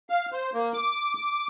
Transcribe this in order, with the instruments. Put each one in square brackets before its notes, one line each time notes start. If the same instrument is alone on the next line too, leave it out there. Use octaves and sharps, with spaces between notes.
[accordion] F5
C5
A#3
D6
D6